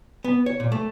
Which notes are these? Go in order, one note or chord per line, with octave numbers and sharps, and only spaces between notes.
B3
C#5
A#2
A3